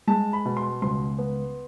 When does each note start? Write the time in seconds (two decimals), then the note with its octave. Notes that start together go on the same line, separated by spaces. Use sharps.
0.07 G#3 A5
0.33 B5
0.46 B2
0.57 C6
0.82 C#2 C6
1.19 B3